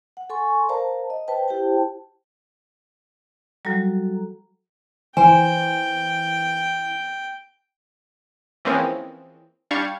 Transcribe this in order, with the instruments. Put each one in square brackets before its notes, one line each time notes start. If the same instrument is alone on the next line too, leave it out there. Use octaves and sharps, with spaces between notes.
[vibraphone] F#5
A4 G#5 C6 C#6
A#4 C5 D5 F5 A5 A#5
D#5
B4 C5 G5 A5
E4 G4 C5 G5 A5
[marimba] F#3 G3 [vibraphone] F#4 A4 A#5
[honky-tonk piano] E3 [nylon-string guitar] C5 [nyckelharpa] G5 [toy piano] G#5
[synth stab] E3 F3 G#3 A#3 C4 C#4
G3 D4 F5 C#6 G#6